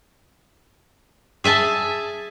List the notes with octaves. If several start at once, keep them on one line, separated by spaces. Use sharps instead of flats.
G#4 E5 G#5 A5